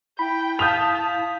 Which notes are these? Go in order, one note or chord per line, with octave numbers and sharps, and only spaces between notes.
E4 G5 B5
E4 F5 A5 D#6 G6 B6 F7